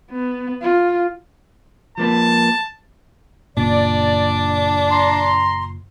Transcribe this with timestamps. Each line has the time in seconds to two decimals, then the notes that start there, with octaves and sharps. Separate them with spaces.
0.11 B3
0.62 F4
1.98 F3 A#3 B4 A5
3.57 F#1 A#2 D4 D5
4.91 A#5 C6